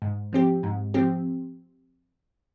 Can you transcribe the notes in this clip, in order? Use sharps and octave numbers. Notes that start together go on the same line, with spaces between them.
G#2
F3 C4 G4
G#2
F3 C4 G4